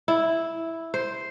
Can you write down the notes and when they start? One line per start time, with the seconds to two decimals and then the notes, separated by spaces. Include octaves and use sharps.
0.08 E4
0.94 C5